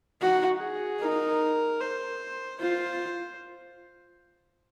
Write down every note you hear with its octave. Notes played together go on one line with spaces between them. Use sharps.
D#4 F#4
G#4
D#4 A#4
C5
F4 C5